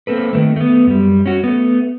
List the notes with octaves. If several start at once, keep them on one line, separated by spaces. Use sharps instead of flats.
A#3 C4 A4 B4
D#3 E3 A3
A3 B3
F#2 G3
C#4 F#4
A3 B3